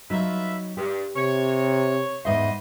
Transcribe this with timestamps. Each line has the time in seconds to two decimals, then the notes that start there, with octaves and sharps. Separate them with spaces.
0.10 F#3 D#4 F4 B4 E5
0.77 G2 G4
1.16 C3 C#5
2.25 E2 G#2 B4 C5 D#5 E5